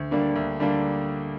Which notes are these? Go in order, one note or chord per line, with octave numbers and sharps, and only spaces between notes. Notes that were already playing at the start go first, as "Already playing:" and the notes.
Already playing: D2
D3 G3 A#3 D4
D2
D3 G3 A#3 D4